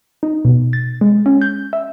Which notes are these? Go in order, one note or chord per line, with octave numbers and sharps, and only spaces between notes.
D#4
B2
A6
G#3
C#4
G6
E5